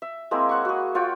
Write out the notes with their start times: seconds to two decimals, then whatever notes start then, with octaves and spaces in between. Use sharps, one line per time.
0.02 E5
0.31 G#3 A#3 C4 E4
0.49 C#5 F#5 C#6
0.65 F#4 G#4
0.95 F4 C#5 F#5 G5